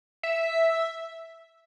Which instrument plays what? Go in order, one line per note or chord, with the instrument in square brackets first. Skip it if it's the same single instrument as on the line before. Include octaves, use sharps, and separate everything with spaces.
[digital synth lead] E5